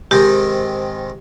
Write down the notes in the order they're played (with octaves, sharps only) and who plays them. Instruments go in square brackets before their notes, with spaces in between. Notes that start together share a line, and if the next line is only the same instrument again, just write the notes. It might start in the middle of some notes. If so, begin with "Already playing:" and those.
[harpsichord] G#2 C3 D#3 [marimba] G4